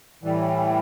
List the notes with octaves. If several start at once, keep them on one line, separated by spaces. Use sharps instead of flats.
A2 E3 G3